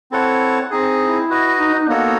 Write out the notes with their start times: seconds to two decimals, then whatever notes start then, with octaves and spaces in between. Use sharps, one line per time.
0.11 C4 E4 A4 C#5 F#5
0.71 C4 D#4 G#4
1.00 E4
1.30 F#4 B4 D#5
1.59 D#4
1.75 D#4
1.89 A#3 B3 D#4 F#4 A4 C#5